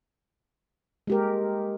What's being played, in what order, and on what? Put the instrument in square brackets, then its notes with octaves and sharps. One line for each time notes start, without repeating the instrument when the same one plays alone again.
[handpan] G#3 G4 A#4